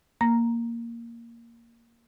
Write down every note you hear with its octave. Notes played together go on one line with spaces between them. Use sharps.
A#3 A#5 A#6